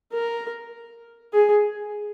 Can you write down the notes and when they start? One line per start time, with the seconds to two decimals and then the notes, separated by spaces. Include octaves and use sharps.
0.13 A#4
1.33 G#4